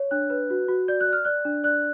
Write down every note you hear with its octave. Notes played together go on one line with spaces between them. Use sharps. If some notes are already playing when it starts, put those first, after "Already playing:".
Already playing: C#5
D4 F#6
B4
F#4
F#4
D5 G6
F#6
D5
F6
D5 F#6
D4
D5 F#6